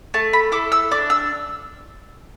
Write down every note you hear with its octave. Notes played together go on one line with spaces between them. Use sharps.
A3 A5
B5
E4 A4 D6
E6
D4 D6
E6